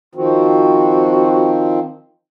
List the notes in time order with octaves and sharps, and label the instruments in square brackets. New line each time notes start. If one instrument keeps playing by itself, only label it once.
[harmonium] D#3 F3 C4 [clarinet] F#4